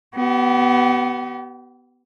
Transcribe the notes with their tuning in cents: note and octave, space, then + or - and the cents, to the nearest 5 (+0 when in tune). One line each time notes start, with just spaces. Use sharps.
B3 +0 G4 -40